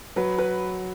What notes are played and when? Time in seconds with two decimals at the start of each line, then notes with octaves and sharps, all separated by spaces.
0.16 F#3 B4
0.38 B4